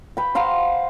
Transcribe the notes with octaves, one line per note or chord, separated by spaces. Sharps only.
B4 G5
C5 F5 F#5 A#5